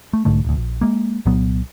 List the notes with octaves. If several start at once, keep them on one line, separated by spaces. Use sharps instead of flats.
A3
B1 G#2 D3 A3
D1 D2
A#1
G#3 A#3
C2 A#2 F#3 B3